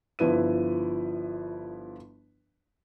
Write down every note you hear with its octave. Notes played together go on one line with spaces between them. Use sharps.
G1 F3 E4 B4 D#7